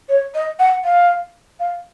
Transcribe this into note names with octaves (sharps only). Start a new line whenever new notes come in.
C#5
D#5
F#5
F5
F5